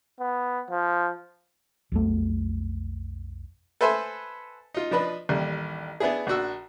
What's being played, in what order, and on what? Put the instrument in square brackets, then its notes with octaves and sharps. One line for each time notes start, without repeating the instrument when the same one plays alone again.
[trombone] B3
F3
[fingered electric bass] B1 F2 A3
[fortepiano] A4 B4 C5 E5 G#5 C6
D#4 F4
F3 D4 B4 D#5
A1 D#2 G3
B3 D4 E4 G#4
A#1 D4 F#4 E6